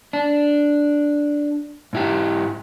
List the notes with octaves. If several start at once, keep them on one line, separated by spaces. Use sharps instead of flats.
D4
G#2 E4 G4